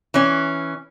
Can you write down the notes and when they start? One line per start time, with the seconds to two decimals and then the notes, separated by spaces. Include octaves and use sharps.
0.14 E3 C#4